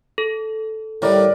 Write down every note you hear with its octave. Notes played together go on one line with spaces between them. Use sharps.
A4
A2 D#3 G3 A#4 B4 D5